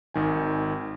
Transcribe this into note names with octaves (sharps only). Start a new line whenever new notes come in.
G#1 D#3 G#5